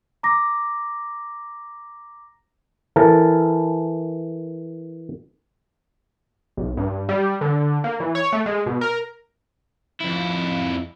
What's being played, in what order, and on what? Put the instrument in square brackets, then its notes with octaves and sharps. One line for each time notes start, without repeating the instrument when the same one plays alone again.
[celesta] A#5 D6 A#6
[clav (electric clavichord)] E3 A4 A#4
[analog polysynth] B1
G2
G3
D3
A#3
E3
C#5
A3
G#3
B2
A#4
[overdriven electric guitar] F2 E4